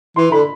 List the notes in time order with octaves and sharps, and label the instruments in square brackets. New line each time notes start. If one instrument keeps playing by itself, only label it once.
[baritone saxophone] E3 [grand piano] C6
[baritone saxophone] D3 [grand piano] B5